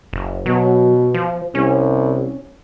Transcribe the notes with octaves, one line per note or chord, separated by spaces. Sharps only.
F#1
B2 F#3
F3
C2 C#4